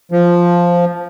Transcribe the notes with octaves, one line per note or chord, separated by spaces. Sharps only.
F3